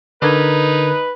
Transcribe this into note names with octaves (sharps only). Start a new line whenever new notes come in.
D3 D#4 A#4 B4 G#6